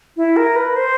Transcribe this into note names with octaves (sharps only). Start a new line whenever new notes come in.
E4
A#4
B4
C5